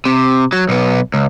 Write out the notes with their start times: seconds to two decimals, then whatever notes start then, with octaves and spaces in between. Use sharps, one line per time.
0.05 C3
0.53 F#3
0.69 B1 B3
1.14 C#2